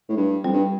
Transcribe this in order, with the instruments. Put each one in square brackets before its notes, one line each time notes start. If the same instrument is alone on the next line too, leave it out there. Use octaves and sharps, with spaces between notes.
[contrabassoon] A2
G2
[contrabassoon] F2 [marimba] G3
[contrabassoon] G2